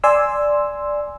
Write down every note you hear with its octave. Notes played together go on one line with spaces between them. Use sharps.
D5 G#5 C6 E6